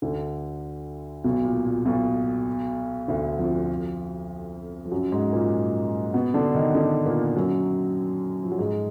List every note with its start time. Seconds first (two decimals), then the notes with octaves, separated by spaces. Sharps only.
0.02 D2 D3
1.24 B1 B2
1.44 A#2
1.65 A#2
1.85 B1 B2
3.08 D2 D3
3.39 F2 F3
4.86 F3
4.91 F#2 F#3
5.12 G#2 G#3
5.32 A#2 A#3
6.14 B2 B3
6.34 D3 D4
6.55 D#3 D#4
6.75 D3 D4
7.06 A#2 A#3
7.36 F#2 F#3
8.44 F3
8.52 F#3
8.59 G#2 G#3